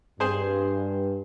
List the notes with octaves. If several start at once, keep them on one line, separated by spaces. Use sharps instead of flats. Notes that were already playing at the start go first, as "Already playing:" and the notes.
G2 G#4 C5 G#5